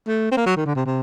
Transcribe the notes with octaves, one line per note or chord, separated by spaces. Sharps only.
A3
C4
A#3
F#3
D#3
D3
C3
C3